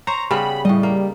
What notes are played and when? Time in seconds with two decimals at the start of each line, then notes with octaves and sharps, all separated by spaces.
0.07 C5 C#5 A#5
0.31 C#3 G3 B3 B5
0.65 A2 G3 D#5
0.83 A#3